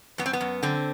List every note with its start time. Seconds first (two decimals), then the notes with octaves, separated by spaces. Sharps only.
0.18 F#2 B3
0.26 C4
0.33 B3
0.41 F#2
0.63 D3 C4